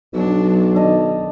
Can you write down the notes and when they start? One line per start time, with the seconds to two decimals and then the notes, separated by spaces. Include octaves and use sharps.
0.13 B1 F#3 D4
0.76 D#3 D4 D#5